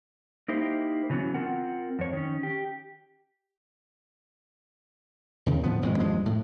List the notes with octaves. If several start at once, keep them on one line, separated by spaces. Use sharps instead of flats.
A#3 D#4 E4 G4 C5
C#3 E3 F#3 B3 C#4
C4 F4 A#4 F#5
F2 C#5
D#3 C#4
G4
D#2 C#3
D2 A2 F3 B3
D#1 F2 A2 G#3
D#1 G2 F3 G#3
A2